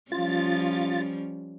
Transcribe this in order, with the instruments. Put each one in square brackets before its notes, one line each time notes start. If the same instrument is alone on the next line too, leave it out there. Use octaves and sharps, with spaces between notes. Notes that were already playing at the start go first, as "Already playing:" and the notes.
[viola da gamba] F3 G3 C#4 [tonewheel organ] F4 A6